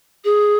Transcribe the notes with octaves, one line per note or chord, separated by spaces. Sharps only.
G#4